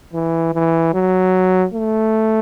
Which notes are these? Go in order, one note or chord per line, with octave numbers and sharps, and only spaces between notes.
E3
E3
F#3
A3